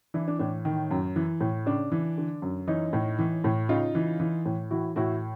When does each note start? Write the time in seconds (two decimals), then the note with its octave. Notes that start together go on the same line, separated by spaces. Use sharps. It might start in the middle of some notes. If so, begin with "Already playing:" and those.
0.14 E3 D4 E4
0.28 D4
0.39 A2 D4
0.65 D#3
0.91 F#2
1.16 E3
1.41 A2
1.66 C#3 D4
1.92 E3
2.18 D3
2.42 F#2
2.67 E3 C#4 D#4
2.93 A2
3.19 E3
3.44 A2
3.69 C#3 D#4 F4
3.95 E3
4.20 E3
4.46 A2
4.71 E3 E4 F#4
4.96 A2 E4 F#4